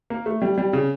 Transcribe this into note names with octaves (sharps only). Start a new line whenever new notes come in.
A#3
A3
G3
G3
C#3